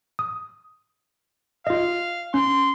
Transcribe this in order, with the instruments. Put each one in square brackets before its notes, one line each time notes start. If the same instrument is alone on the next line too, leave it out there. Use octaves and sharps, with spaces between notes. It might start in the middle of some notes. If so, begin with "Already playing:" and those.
[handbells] D#6
[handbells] F4 D#5 [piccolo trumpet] F5
[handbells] C#4 [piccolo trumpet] C6